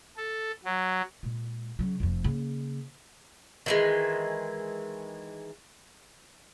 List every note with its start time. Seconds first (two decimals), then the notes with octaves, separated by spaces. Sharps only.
0.17 A4
0.65 F#3
1.23 A#2 G#3
1.79 C#3 F#3
2.00 F1 F2
2.24 C#3 A#3
3.66 D#3 E3 G#3